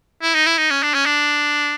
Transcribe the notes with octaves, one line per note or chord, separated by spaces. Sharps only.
E4
D#4
E4
D#4
C#4
D4
C#4
D4